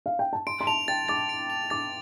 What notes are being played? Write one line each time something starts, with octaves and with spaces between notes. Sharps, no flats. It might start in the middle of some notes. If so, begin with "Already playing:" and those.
F5
G5
A5
C6 D7
C6
A5 F7
G5 A6
D6 A6
D7
F7
D6 A6